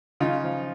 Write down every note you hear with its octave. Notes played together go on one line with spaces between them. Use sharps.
C#3 D#4 F4
F3